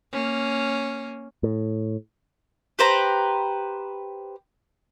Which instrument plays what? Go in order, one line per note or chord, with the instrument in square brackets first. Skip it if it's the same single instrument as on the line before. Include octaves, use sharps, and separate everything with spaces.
[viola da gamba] A#3 C#4
[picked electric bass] A2
[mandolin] G4 B4 C5 A#5